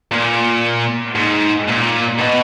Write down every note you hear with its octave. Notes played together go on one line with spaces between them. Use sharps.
A#2
G#2
A#2
B2